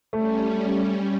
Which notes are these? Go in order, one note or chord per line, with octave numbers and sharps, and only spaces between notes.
G3 A3 C#4